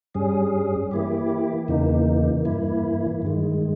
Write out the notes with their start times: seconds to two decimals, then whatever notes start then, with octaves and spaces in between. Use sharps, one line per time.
0.15 G2 G3 C#4 G#4
0.91 E3 A#3 E4 G4
1.68 E2 C#3 E3 A#3 D#4
2.45 G2 E3 A#3 E4
3.22 G2 D#3 G#3